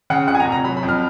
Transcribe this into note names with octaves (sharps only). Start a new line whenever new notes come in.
C#3 F#5
F2 F#5
G#5
A#5
F1
A#5
F#3 B5
B5
F2
F6